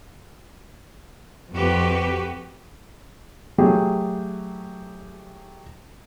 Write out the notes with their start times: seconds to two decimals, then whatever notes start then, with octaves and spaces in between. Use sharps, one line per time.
1.53 F2 F#4 G4 B4
3.58 F#3 A3 G4 G#4